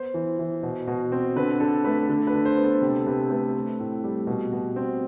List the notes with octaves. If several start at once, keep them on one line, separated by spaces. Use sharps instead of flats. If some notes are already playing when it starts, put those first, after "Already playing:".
Already playing: B3 C5
E3
E3
B2
B2
C4
D3 B4
D3 A4
A3 B4
D3 A4
B4
D3
C5
B3
A4
C3 A4
C3 B4
A3 B4
C4
A2
G3
B2
B2
C4